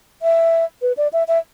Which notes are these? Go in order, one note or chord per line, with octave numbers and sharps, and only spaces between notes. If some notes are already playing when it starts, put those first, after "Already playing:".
E5
B4
D5
E5
E5